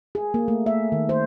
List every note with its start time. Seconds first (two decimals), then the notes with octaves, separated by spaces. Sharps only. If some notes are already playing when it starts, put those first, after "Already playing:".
0.15 G#4
0.34 A#3
0.48 A3
0.66 E5
0.92 D#3
1.09 C5